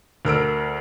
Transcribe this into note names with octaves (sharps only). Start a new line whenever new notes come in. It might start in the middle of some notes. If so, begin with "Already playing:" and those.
D2 A#4 E6 D7